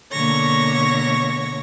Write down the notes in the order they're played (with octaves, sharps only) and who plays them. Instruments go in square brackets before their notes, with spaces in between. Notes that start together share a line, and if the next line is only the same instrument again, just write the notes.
[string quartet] B2 D3 A#3 C#5 C#6 A#6